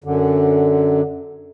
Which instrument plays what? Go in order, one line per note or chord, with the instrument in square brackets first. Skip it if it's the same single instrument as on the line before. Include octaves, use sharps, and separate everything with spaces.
[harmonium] F#2 D3